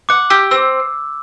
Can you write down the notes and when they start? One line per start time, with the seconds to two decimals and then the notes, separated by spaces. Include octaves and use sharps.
0.09 F#5 D6
0.30 G4 E6
0.51 C4 E6